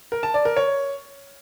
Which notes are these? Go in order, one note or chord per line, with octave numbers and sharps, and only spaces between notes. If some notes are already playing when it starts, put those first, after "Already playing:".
A#4
A5
D5
A#4
C#5